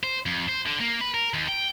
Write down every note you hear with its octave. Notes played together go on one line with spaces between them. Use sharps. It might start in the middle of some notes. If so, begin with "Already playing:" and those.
C5
F2
C5
D3
A#3
B4
A#4
D#2
G5